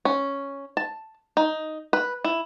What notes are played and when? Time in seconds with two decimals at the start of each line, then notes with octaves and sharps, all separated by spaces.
0.05 C#4
0.77 A5
1.37 D#4
1.93 B4
2.24 E4